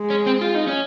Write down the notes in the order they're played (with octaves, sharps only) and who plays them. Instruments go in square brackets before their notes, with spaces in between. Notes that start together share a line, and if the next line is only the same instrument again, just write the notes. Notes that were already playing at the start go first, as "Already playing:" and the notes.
Already playing: [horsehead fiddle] G#3
[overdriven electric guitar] C#4
C4
F4
D#4
C#4